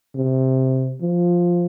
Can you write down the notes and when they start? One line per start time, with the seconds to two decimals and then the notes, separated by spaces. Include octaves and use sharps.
0.16 C3
1.02 F3